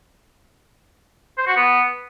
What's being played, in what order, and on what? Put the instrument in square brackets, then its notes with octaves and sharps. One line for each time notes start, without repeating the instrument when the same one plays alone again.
[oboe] C5
F#4
B3